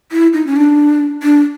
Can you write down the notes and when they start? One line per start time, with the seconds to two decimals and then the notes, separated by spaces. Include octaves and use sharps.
0.12 E4
0.33 D#4
0.47 C#4
0.56 D4
1.23 D4